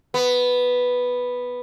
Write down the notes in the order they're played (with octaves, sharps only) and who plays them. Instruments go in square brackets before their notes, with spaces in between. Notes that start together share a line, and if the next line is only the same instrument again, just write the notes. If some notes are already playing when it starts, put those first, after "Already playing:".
[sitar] B3